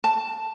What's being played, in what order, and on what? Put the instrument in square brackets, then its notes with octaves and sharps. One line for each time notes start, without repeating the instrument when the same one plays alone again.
[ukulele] A5